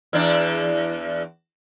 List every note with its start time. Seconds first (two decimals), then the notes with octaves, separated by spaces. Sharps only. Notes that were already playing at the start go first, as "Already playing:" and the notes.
0.13 E2 D4